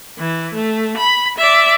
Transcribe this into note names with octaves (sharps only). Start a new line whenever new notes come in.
E3
A3
B5
D5 E5